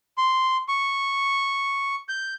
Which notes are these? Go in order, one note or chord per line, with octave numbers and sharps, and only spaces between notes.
C6
C#6
G6